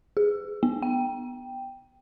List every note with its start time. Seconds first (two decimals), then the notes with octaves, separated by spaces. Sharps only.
0.17 G#4
0.63 B3
0.83 G5